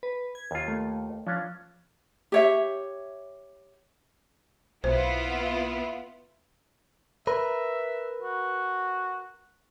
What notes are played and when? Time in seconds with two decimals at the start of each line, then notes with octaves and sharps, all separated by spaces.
0.03 B4
0.35 G#6
0.51 D#2 F4
0.68 A3
1.27 F3 C#4 D4
2.32 G4 C#5 E5
4.84 B1 B3 E4 F4 C5
7.27 A#4 B4 E5
8.22 F#4